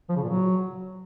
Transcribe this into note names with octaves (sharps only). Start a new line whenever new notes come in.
F3
C#3
A#2
F#3